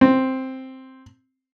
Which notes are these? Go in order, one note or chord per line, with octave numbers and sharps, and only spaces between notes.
C4